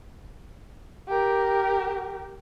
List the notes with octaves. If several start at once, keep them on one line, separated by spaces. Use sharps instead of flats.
G4 A#4